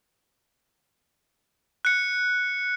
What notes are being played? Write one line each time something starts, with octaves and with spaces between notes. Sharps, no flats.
F#6 C#7